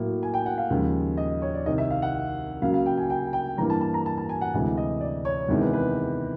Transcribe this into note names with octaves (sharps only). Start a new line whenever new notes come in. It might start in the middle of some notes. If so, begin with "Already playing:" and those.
Already playing: A2 F#3 A#3
G#5
G5
F#5
F5
D#2 C#3 F3 G#3
D#5
C#5
D5
C2 C3 D#3 D#5
E5
F5
F#5
C#2 C#3 F#3 A#3 F5
F5
G5
G#5
G5
G5
G2 E3 G3 A#3 A#5
A5
A5
A#5
A5
A5
G#5
F#5
D2 C3 E3 G#3
D#5
D5
C#5
E2 C3 D#3 G#3
B4
B4